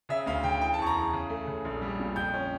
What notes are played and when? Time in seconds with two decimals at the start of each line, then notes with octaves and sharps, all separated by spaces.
0.09 C#3 E5
0.26 D2 F5
0.43 C#3 G5
0.61 E3 G5
0.74 A5
0.78 E2 C#6
0.87 A#5
0.95 E3
1.13 C#3
1.29 A3
1.47 C#3
1.65 A#1
1.82 G3
1.99 A#2
2.16 F2 G6
2.34 C#4